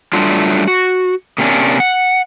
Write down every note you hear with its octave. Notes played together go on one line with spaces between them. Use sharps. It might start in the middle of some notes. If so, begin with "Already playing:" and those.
F#3 G3 A3 D4 F4
F#4
C3 A#3 C#4 D4
F#5